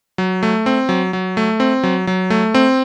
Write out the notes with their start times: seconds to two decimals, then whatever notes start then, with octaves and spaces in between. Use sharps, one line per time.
0.18 F#3
0.43 A3
0.66 C4
0.89 F#3
1.13 F#3
1.37 A3
1.60 C4
1.83 F#3
2.07 F#3
2.30 A3
2.54 C4